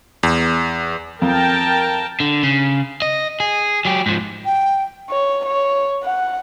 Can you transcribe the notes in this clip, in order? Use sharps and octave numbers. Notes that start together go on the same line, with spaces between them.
E2
F2 A#4 G5 A5
D3
C#3
D#5
G#4
F#3 G4
G#2 F3
G5
C#5
C#5
F#5